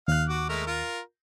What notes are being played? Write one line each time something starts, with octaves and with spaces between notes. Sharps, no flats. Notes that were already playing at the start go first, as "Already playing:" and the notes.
D#2 F5 F#6
F#4 D6
G#3 A3 A#4
F4 A#4